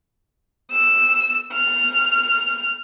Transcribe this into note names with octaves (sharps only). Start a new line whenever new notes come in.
E6
F6